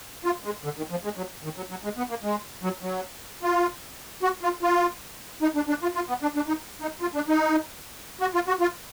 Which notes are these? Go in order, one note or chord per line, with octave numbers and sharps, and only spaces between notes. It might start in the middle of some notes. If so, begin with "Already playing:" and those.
F4
G#3
D3
D#3
F3
G#3
F#3
D#3
F#3
F#3
G#3
B3
A#3
G#3
F#3
F#3
F4
F#4
F4
F4
D#4
D4
D4
F4
F4
B3
D4
D4
D#4
D#4
F4
D4
D#4
F#4
F4
F#4
F4